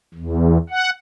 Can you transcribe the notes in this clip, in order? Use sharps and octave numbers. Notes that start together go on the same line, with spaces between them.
E2
F#5